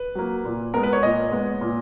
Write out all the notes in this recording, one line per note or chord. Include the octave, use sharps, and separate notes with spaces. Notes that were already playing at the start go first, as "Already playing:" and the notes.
Already playing: B4
F#3 A#3
A#2
G#3 B3 A#4
B4
C#5
A#2 D#5
G#3 B3
A#2